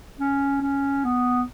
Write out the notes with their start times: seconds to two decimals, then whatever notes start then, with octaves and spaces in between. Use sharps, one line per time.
0.19 C#4
0.61 C#4
1.04 B3